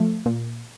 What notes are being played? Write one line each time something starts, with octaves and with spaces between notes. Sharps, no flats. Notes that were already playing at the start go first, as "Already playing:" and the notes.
Already playing: F3 A3
A#2